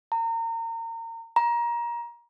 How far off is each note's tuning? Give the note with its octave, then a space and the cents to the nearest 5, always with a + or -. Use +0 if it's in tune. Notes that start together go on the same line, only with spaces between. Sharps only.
A#5 -30
A#5 +25